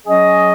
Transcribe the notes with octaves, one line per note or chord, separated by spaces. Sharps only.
F#3 C#4 G#4 D#5